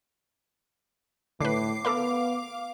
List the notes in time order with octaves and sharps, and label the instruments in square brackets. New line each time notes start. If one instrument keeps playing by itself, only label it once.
[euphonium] A2 [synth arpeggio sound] D3 B4 [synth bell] D6 C7
[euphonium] B3 [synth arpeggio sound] A4 A#4 B5 [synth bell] F5 D6